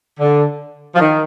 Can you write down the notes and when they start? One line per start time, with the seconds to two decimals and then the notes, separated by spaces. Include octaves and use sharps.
0.20 D3
0.95 F3
1.00 D#3